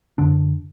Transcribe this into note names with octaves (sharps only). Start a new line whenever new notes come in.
F#2 D3 D4